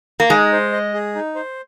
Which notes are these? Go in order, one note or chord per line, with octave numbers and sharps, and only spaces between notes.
A#3
G#3 D#4
C5
D#5
G#4
D#4
C5